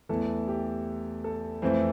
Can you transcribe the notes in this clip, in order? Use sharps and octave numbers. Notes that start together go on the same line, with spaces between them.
E2 E3 A3 A4
G4
A4
F2 E3 A3 C4 C5